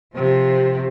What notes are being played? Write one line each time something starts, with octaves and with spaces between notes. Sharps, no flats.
C3 F3